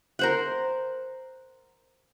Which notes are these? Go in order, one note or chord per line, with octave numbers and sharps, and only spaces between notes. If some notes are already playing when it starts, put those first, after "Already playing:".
A#4 C5 F#5